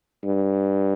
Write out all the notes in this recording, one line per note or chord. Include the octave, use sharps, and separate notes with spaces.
G2